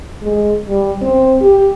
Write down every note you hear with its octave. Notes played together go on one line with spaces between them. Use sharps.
G#3
G3
C4
G4